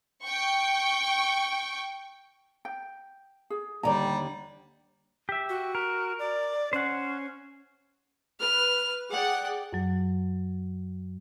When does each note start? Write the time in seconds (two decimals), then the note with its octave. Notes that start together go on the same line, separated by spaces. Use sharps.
0.23 G5 C#6
2.65 G5
3.50 G#4
3.83 D#2 D3 G3 D5 A#5
5.29 G4 E5
5.49 F#4
5.75 A#4
6.19 D5
6.73 C#4 C5 F#5
8.40 B4 F6
9.11 G#4 D5 F#5 G5
9.73 F#2 F#3